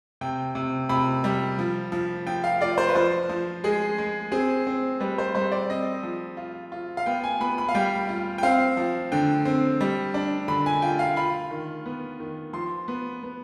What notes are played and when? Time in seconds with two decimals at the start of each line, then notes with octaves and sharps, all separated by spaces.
0.21 C3 G5
0.55 C3
0.89 C3 B5
1.24 G3
1.59 F3
1.92 F3
2.27 F3 G5
2.44 F5
2.61 F4 D5
2.78 C5
2.89 B4
2.95 F3 C5
3.29 F3
3.64 G#3 G#4
3.98 G#3
4.32 C4 G#4
4.67 C4
5.00 G3 B4
5.18 C5
5.35 G3 C5
5.52 D5
5.69 C4 D#5
6.03 F3
6.37 F4
6.72 F4
6.97 F5
7.06 B3 G5
7.24 G#5
7.41 B3 B5
7.58 B5
7.69 F5
7.75 G3 G5
8.09 F4
8.38 G5
8.43 C4 F5
8.77 F3
9.12 D3 G5
9.45 C4
9.81 G3
10.14 D4
10.48 D3 B5
10.66 G#5
10.82 F4 G5
10.99 F5
11.16 F4 B5
11.51 D#3
11.86 B3
12.20 D#3
12.53 F3 C6
12.88 B3
13.23 B3